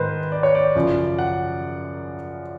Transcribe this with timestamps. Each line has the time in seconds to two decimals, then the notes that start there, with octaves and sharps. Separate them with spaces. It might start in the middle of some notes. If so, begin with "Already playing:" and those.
Already playing: G#2 D#3 B4 C5
0.32 D5
0.43 C#5
0.55 D5
0.75 F#2 C#3 F3
1.19 F#5